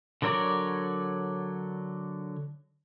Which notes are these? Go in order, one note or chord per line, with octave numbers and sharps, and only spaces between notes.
D3 F#3 A#4 C#5 D5